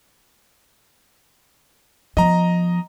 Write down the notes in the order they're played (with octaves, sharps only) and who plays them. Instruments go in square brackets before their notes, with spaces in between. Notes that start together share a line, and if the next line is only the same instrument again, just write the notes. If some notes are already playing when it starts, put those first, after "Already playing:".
[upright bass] F3 B3 [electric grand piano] D#5 A#5